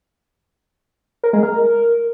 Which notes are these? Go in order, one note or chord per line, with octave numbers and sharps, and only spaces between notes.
A#4
G#3
A#4